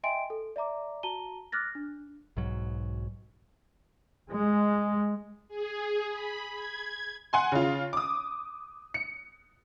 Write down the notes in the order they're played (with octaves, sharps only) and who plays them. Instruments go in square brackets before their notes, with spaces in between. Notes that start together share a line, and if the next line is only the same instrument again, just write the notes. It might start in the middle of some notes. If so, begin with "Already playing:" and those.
[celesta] D#5 E5 G5 G#5 C6 D7
A4
D5 E5 A#5 D6
F#4 A5 A#5 D#7 G7
D6 F6 F#6 A6 A#6
D4
[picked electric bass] B1 G#2 F#3
[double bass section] G#3
[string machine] G#4
B5
G#6
[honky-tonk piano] F#5 G#5 C6
C#3 F4
D6 D#6
C#7